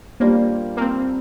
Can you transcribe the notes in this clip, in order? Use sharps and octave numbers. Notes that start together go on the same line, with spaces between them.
G3 A#3 D4 F4 C5
A#3
C4